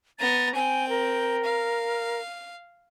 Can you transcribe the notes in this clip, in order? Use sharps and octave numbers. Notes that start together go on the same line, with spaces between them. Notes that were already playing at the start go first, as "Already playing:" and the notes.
B3 A#5 A6
C4 G5 G#5
A#4
F5